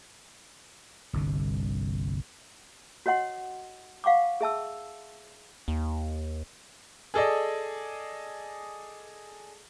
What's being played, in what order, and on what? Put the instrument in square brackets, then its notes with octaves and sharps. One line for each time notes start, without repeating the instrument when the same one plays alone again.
[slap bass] G1 C2 D3
[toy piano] F#4 C#5 D#5 F#5 C6
F5 F#5 C#6 D6
G#4 E5 A5 E6
[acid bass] D#2
[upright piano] G#4 A4 D5 D#5